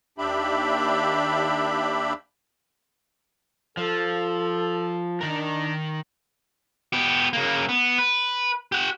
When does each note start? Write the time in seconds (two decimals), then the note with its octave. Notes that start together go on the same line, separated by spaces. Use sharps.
0.18 D#2 D4 G4 E5 B5
3.77 F3 A4
5.21 D#3 D4 A#4
6.93 B3 G4
7.33 C#3 A#3
7.69 B3
7.98 B4
8.72 G4 F#5